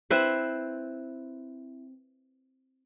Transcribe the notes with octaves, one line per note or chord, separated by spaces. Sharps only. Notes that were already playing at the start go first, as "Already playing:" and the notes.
C4 E4 B4 C5